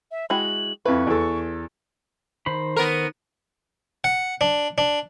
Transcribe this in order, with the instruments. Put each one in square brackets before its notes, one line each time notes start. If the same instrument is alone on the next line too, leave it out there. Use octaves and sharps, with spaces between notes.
[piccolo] E5
[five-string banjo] G#3 E4 F#4 [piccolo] F#7
[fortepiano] F2 E4 [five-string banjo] B4 [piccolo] C#6
[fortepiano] E2 A4
[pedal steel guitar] D#3 C5 B5
[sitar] B3 A#4
[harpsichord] F#5
D4
D4